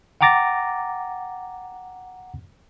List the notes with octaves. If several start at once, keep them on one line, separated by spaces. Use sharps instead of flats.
F#5 G5 A#5 D6 A6 A#6